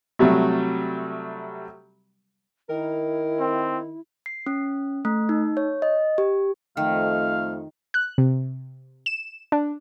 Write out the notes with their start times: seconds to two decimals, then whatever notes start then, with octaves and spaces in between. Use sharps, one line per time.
0.19 C3 F#3 G3 A3
2.70 D#3 E4 A#4
3.40 C4
4.26 C7
4.46 C#4
5.05 A3
5.29 D#4
5.57 C#5
5.82 D#5
6.18 G4
6.77 F2 D#3 F3 A3 F5
7.94 F#6
8.18 C3
9.06 E7
9.52 D4